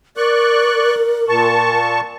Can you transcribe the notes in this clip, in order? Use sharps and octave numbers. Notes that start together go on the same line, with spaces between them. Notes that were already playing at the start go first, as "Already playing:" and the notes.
A#4 D5 C#6 F#6
A#2 A5 C#6